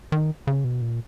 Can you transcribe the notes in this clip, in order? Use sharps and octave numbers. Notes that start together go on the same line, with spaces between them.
D#3
C#3
B2
A#2